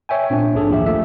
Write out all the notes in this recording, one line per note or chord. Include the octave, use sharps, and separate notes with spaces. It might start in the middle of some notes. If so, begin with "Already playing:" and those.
C#5 E5 G5 G#5
A#2 C4 D4
A#1 G#2 D4 G#4 A4
D#2 F3 G4 E5
A3 F4 E5